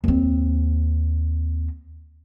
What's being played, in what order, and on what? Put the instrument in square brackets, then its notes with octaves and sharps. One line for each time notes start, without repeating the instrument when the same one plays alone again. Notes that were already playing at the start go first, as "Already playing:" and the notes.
[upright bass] D#2 C4